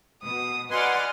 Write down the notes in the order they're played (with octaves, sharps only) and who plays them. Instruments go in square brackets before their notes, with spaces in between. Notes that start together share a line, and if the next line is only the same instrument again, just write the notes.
[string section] B2 [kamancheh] D#6
[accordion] B4 G#5 [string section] D5 F#5 C6 [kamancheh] D#5 F6